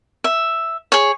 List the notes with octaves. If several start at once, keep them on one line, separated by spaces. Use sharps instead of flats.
E5
G#4 C#5